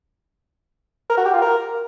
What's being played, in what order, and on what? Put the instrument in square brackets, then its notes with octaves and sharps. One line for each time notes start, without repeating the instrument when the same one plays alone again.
[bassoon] A#4
F#4
G4
F4
A#4